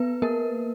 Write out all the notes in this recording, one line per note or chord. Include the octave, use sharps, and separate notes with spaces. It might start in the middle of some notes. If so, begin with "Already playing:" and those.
Already playing: B3 B4
A#3 A#4